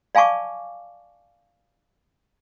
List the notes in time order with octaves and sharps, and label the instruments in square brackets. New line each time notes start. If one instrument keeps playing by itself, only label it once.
[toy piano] D5 F5 G#5 A5 C#6 D6